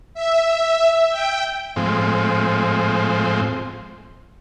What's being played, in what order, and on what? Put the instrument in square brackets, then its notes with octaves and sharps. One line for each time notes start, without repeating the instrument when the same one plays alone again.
[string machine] E5
G5
[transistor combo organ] A2 F3 G#3 C4